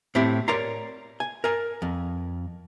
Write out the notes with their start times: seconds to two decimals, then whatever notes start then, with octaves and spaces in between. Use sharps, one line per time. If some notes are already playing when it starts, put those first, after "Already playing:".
0.15 A2 C4 E4 G4
0.48 A#4 C#5 D5 A#5 C6
1.20 G#5
1.44 A#4 G#5
1.82 F2